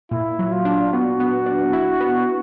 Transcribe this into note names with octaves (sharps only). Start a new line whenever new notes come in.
A#2 E4
F#3
F4
D4
B3 F#4
B3
D4
E4
B3